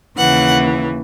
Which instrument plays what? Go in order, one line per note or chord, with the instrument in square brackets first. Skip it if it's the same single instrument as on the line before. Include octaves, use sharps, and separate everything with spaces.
[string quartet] D#2 C#3 E3 F#5